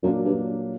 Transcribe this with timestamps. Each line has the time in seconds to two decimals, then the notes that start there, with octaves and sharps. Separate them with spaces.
0.04 F#2 A#2 F#3 A#3 D4
0.25 G2